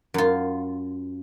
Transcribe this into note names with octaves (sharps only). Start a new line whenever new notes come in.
F#2 F4